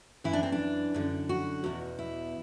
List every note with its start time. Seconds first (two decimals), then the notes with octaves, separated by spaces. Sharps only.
0.24 F#2 E3 E4
0.33 D4
0.43 C4
0.52 D4
0.94 F#2 D3
1.29 F#4
1.64 E2 B2
1.99 E4